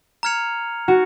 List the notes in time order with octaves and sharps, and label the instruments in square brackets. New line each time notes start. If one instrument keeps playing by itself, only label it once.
[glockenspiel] A#5 F6 G#6 C#7 F7
[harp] F#4